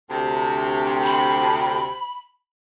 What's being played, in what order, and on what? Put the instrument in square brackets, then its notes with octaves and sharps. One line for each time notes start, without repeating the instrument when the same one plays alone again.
[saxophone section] D2 C3
[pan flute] B5